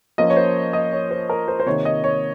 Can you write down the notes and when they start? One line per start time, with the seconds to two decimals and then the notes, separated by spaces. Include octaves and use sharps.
0.18 F3 A#3 C#4 D#5
0.30 C#5
0.37 C5
0.73 D#5
0.92 C#5
1.11 C5
1.30 A#4
1.48 C5
1.60 C5
1.66 C3 D#3 A#3 C#5
1.85 D#5
2.04 C#5